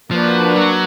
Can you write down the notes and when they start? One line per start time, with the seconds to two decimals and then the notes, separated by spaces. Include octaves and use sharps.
0.11 F3 A#3 D4 F#4 B4
0.56 F#3